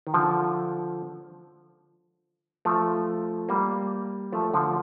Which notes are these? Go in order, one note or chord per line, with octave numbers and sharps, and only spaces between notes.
D#3
D3 F3
F3 A3
G3 A#3
F3 A3
D3 F3